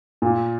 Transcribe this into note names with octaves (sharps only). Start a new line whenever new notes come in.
A#2